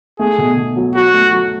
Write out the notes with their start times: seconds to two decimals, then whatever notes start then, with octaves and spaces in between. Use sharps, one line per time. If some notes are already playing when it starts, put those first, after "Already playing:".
0.19 A3 G#4
0.38 B2
0.57 B2
0.76 F#3
0.95 F#3 F#4
1.14 A3
1.32 F#3